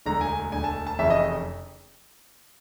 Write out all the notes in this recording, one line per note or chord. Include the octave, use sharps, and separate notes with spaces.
E1 D2 D3 A#5
G#5
E1 D2 D3 G#5
A5
A5
F1 F2 C#3 E3 E5
D#5